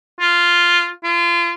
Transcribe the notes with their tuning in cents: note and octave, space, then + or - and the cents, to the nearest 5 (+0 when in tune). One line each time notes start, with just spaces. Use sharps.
F4 -5
F4 -30